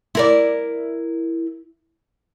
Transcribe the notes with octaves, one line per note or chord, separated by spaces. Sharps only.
E4 A#4 D5